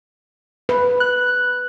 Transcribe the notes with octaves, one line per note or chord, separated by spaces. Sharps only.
B4
F#6